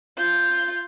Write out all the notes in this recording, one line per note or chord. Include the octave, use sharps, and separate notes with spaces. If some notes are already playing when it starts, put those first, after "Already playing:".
F4 G6